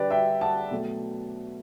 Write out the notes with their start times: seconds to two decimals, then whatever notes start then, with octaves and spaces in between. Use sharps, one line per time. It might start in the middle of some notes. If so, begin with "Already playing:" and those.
Already playing: D3 G3 G4 B4 D5
0.10 E5 G5
0.41 F#5 A5
0.71 B2 F#3 A3